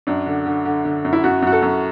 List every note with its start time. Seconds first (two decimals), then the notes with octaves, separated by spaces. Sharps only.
0.07 F#2 D4
0.26 D3
0.46 D3
0.65 D3
0.85 D3
1.05 F#2
1.13 E4
1.24 F#2 F#4
1.42 F#2 F#4
1.52 A4
1.62 F#2